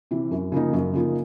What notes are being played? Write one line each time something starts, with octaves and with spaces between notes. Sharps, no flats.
C3 E3
F#2
C#3 F3 A#3 D#4
F#2
C#3 F3 A#3 D#4